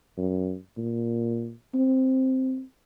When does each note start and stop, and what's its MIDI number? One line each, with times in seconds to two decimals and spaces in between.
0.18 0.56 42
0.77 1.53 46
1.74 2.63 60